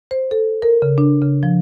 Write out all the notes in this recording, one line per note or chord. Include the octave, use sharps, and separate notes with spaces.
C5
A4
A#4
C#3
D4
C#3
F3